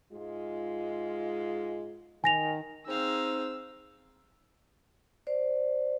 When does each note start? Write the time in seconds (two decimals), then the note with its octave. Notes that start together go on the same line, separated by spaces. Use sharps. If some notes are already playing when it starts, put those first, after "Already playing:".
0.13 G#2 G#3 F4
2.24 D#3 G#5 A#6 F7
2.87 C4 D#4 G#4 F5 E6
5.27 C5 D5